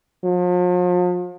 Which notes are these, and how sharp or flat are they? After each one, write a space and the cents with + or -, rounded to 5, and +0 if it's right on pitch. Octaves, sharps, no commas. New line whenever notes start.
F3 +40